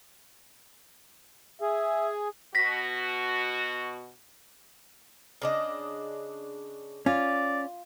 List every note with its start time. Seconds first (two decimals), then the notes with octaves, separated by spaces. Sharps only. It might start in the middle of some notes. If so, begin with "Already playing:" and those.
1.62 G#4 E5
2.55 B2 F#4 A#6 B6
5.42 C#3 D4 D#5
7.06 C#4 F4 D5